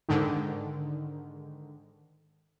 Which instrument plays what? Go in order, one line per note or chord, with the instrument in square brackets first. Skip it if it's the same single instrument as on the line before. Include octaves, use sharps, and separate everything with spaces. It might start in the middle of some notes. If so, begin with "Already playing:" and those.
[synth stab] G#2 D3 D#3